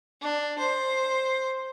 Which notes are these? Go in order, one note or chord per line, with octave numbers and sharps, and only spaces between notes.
D4
C5